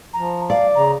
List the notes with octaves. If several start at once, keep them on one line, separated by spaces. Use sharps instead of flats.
F3 A#5
D5 F5
C#3 A#5